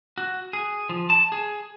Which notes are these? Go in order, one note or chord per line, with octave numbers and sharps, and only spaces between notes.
F#4
G#4
F3
A5
G#4